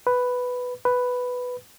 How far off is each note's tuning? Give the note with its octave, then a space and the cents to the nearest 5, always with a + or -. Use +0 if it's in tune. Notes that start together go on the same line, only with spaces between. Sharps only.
B4 +5
B4 +5